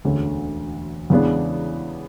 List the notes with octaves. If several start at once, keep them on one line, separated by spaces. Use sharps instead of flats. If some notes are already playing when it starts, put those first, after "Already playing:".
E1 D2 D3 A3 C#4
E2 C#3 G#3 B3 D4